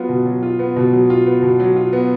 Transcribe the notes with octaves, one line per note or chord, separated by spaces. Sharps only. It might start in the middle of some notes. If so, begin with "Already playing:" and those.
Already playing: F#3 B3 F4
B2
F#3
F4
B3
B2
F#3
F4
B3
B2
F#3
F4
B3